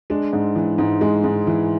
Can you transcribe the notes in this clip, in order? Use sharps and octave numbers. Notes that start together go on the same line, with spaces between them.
G#3 D4
G#2
E3
G#2
G#3
G#2
E3